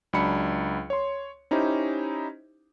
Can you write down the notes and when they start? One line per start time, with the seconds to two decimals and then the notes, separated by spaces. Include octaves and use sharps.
0.13 C#2 F#3 D4 B5 C#7
0.90 C#5 C6
1.51 C#4 D#4 E4 G4 C5